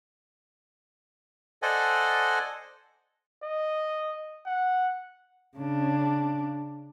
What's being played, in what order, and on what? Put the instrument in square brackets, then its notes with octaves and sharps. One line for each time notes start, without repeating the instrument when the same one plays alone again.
[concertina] A4 C5 D5 D#5 F#5 G#5
[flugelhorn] D#5
F#5
[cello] C#3 D4